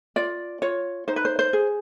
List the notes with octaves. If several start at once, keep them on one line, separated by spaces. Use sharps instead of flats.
F4 D5
F4 C#5
D#4 C5
B4
C5
C5
G#4